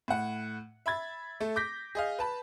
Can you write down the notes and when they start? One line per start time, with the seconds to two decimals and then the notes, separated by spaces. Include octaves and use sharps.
0.08 A2 F#5
0.86 E5 B5 G#6 A6
1.40 A3 A4
1.56 D6 G6 A#6 B6
1.95 G#4 D#5 F5
2.19 B4 A5 B5